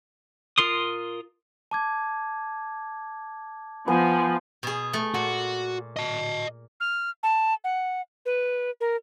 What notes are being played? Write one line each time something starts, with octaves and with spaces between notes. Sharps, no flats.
F4 A#4 C6 D#6
A5 D6 G#6
F3 B3 G#5
B2 G#4
A3
A#2 F#4
D#5 A5
F6
A5
F#5
B4
A#4